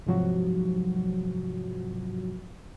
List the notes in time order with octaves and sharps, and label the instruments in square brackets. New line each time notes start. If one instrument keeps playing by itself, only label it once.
[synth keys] G#2 C3 F3 F#3 F#4